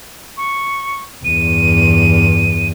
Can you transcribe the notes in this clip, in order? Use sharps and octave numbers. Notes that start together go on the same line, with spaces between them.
C#6
E2 G2 D#7